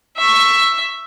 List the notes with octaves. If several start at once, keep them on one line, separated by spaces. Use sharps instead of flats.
E5 C#6